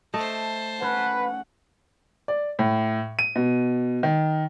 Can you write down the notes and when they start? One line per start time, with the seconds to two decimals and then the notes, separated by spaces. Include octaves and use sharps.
0.14 A3 C5 D#5 A5
0.82 C#4 B4 F#5
2.28 D5
2.59 A2
3.19 D#7
3.36 B2
4.03 D#3